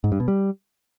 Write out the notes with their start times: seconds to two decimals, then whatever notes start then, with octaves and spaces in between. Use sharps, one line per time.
0.04 G#2
0.12 G2
0.20 B2
0.28 G3